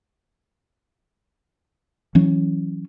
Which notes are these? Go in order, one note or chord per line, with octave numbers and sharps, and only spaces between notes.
E3 F#3 C#4